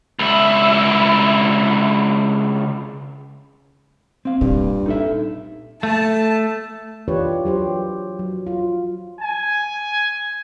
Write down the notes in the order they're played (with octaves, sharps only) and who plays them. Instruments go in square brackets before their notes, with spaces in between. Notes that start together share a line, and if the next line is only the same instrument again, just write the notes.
[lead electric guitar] C#2 E4
[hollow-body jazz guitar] C4 F5
[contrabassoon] G2 [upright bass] A#2
[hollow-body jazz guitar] D#4 A4 E5
[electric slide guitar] A3 [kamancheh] A5
[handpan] E3 D4 F4 G4 B4 C#5
F#3 G4 C5
F#3
F4
[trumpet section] G#5